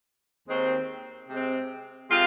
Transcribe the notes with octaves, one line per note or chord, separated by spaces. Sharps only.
D#2 D#3 G#3 C4
C3 G#3 C4
C3 G#3 F4